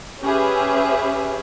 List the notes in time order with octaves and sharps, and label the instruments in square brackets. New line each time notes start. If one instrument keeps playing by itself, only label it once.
[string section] C#4 G4 G#4 B4 E5